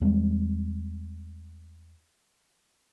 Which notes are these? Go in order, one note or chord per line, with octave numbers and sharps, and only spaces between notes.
E2 G3 G#3 C4